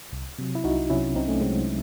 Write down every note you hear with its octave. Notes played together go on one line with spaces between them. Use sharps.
C2
C3 F#3
E4
C2 D#4 F#4
C3 F#3 C#4 E4
C2 C4 D#4
A3 C#4
C3 F#3 G#3 C4